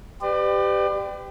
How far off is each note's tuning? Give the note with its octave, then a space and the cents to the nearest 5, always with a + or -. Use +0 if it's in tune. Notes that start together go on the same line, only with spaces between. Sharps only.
G4 +0 B4 +40 D5 +30